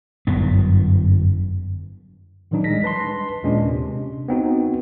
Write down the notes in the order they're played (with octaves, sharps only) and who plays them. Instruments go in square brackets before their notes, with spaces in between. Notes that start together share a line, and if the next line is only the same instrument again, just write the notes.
[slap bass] G1 F#2 B3
[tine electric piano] A2 D#3 E3 F#3 D4 D#4
G3 G#3 A#6 B6
B4 A5 C6
D#2 A#2 G#3 C#4 D4
C3
B3 C4 D#4 F#4